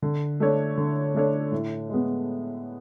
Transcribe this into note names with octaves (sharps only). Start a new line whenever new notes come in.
D3
A3 D4 A4 C#5
D3
A3 D4 A4 C#5
A2
G#3 B3